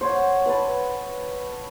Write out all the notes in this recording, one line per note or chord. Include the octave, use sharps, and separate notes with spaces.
C5 C#5 F#5
B4 A5